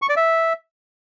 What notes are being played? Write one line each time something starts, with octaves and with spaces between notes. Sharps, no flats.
C#6
D5
E5